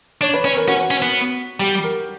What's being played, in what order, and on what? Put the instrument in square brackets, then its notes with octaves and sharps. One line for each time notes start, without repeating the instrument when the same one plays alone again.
[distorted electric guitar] D4 [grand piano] C#5
[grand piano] B4
[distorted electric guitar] C#4 [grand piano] B4
[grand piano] A#4
[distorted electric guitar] C#4 [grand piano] F#4
[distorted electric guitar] C#4
B3
[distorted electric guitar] G3 [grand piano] G4
[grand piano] A#4